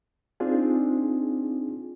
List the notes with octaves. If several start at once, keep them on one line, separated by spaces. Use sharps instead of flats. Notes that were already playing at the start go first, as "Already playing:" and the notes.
C4 D4 D#4 F4 G#4